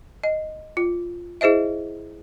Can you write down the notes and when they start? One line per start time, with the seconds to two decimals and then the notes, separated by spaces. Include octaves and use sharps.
0.24 D#5
0.77 F4
1.41 E4 G#4 C5 D#5 E5